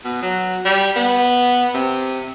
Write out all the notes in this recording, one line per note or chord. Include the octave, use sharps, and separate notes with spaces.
B2
F#3
G3
B3
C3